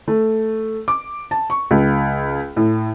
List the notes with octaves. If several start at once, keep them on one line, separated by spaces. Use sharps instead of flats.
A3
D6
A5
C#6
C#2
A2